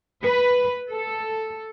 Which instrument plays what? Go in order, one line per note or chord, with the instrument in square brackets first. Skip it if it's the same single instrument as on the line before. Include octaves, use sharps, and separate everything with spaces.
[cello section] B4
A4